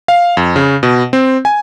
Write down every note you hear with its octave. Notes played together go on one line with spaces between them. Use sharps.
F5
F2
C#3
B2
C4
G#5